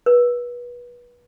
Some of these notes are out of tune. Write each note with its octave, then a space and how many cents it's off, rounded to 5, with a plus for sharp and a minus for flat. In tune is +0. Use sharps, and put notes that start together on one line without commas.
B4 -30